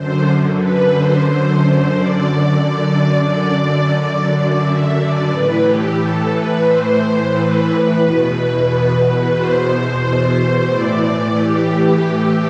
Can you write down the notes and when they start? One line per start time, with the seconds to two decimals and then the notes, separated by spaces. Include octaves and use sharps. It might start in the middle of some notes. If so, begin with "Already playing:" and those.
Already playing: F#2 D3 C5
0.59 B4
0.93 C5
1.26 C5
1.94 D5
2.61 F#2 D3 D5
3.28 D5
3.96 D5
4.29 D5
4.63 E5
4.96 D5
5.29 A2 E3 B4
5.64 G4
5.97 A4
6.31 B4
6.65 C5
7.32 B4
7.99 E2 B2
9.33 C5
10.67 A2 E3 D5
11.02 D5
11.34 G4